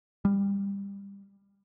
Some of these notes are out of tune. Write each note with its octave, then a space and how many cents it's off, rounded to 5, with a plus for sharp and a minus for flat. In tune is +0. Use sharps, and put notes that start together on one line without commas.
G3 +25